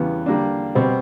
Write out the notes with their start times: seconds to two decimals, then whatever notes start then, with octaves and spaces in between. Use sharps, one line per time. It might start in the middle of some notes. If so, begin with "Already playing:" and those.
Already playing: E2 C#3 E3 G3 B3
0.26 D3 G3 A#3 D4
0.75 B2 G3 C4